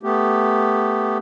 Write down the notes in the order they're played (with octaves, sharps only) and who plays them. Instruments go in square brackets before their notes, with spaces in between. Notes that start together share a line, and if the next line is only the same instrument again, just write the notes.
[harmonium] A3 B3 G4